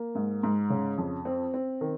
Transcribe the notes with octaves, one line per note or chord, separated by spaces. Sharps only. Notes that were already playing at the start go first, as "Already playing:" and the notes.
Already playing: A#3
G#2
G#2
C#3
F2
C4
C4
D#3